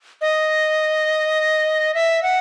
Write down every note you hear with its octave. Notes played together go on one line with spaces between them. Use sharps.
D#5
E5
F#5